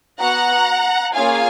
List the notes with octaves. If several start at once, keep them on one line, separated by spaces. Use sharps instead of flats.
B3 F#4 F#5 A#5
A#3 C#4 F4 G#4 F5 G#5